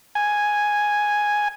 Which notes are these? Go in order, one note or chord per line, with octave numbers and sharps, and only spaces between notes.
G#5